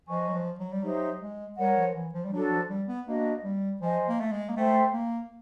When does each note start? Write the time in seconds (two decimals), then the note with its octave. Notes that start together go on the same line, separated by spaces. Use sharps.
0.08 F3 B4 D#5 G#5 C#6
0.28 F#3
0.34 F3
0.59 F#3
0.72 G3
0.83 F#3 D#4 G4 C5 E5
1.20 G#3
1.58 G3 A#4 C#5 F#5
1.77 F3
1.94 E3
2.13 F3
2.25 G3
2.32 F#3 D4 F#4 A4
2.51 F3
2.69 G3
2.88 B3
3.07 A#3 D4 F#4 B4 D#5
3.44 G3
3.81 F3 C5 D#5 G#5
4.08 A#3
4.20 A3
4.32 G#3
4.49 A#3
4.56 A3 A4 C5 E5 G5
4.93 A#3